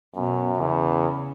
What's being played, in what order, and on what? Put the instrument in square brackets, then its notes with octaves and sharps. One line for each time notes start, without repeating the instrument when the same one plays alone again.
[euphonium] F#2 [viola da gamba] B2
[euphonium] E2 [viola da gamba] C#3